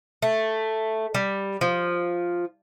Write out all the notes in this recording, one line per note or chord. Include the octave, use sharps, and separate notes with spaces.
A3
G3
F3